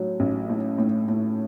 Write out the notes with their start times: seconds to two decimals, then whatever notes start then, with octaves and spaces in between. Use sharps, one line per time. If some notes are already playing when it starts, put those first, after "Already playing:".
Already playing: A2 F#3
0.20 A1
0.49 A2
0.78 A2
1.08 A2